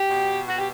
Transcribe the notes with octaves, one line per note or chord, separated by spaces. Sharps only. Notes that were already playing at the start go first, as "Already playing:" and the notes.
Already playing: G4
B2
F#4
G4